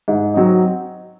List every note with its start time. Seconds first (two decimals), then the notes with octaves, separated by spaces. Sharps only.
0.08 G#2
0.34 F#3 C4 D#4